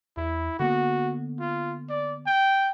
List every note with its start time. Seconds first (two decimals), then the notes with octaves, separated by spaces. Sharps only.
0.17 E2 E4
0.60 D3 A#3 B3 F#4
1.40 F4
1.89 D5
2.27 G5